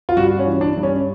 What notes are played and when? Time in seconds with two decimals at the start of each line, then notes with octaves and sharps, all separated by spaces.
0.09 F4
0.17 G2 F#4
0.39 C#4
0.46 E3
0.61 D4
0.77 G2
0.83 C#4